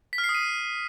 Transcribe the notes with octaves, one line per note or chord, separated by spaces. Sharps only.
B6
F6
C7
D#6
D#7